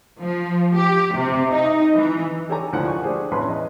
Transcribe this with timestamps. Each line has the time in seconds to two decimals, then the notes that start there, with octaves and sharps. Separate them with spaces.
0.21 F3
0.76 G4
1.15 C3
1.49 D#4
1.93 E3
2.49 G4 A4 C#5 G#5 A#5
2.73 D2 F3 E4 A#4 F#5
2.87 G#5 C#6
3.02 D4 G4 G#4 C5 D5
3.31 A1 E2 C#4 B4 B5 C6
3.49 D#5